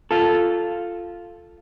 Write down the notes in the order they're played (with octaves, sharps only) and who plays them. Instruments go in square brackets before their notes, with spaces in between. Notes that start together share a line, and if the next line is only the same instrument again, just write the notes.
[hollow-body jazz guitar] F4 A4